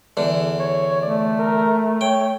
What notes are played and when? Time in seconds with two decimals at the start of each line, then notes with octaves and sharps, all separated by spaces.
0.17 E2 D3
0.59 C#5
1.02 A3 D5
1.38 A#4
2.01 C#5 G5